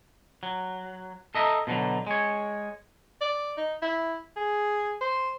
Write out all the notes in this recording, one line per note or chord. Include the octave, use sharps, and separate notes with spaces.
F#3
A4 D#5 E5 A#5
B2 D3 D#3 F#3
G#3 C#5
D5
D#4
E4
G#4
C5